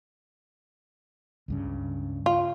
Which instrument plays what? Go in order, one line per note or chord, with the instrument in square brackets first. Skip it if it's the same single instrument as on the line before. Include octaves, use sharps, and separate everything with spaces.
[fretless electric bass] C#2 G2 C#3
[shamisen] F4